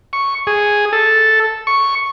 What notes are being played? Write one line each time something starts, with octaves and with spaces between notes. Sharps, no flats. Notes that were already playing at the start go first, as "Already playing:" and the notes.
C#6
G#4
A4
C#6